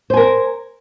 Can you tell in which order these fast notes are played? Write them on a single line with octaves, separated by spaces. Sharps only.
C5 G#5 A#4